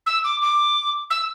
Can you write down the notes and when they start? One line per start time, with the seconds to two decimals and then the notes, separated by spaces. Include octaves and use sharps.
0.06 E6
0.24 D6
0.41 D6
1.10 E6